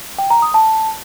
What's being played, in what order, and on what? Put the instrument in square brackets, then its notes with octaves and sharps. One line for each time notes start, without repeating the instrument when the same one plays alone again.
[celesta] G5
A#5
D#6
A5